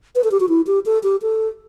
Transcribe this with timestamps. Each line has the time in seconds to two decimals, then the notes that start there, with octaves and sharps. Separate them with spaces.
0.15 B4
0.24 A4
0.31 G4
0.40 F#4
0.49 E4
0.67 G4
0.86 A4
1.03 G4
1.22 A4